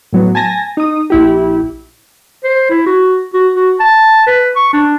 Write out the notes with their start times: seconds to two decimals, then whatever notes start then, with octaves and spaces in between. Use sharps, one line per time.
0.13 A2 F#3 B3
0.35 G#5 A5 A#6
0.77 D#4 D#6
1.10 A#1 E4 G4
2.44 C5
2.70 E4
2.86 F#4
3.34 F#4
3.54 F#4
3.80 A5
4.27 B4
4.56 C#6
4.73 D4